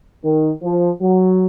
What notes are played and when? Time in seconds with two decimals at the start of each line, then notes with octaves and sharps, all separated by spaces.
0.24 D#3
0.63 F3
1.01 F#3